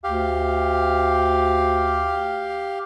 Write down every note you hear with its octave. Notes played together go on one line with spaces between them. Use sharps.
D2 G4 F5